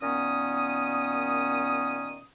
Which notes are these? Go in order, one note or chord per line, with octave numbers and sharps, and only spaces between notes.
A#2 D#3 B3 C#4 D#6